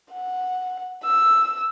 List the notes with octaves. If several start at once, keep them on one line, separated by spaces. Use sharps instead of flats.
F#5
E6